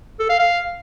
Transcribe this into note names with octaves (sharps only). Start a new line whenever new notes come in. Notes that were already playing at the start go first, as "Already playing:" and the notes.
A4
F5
F5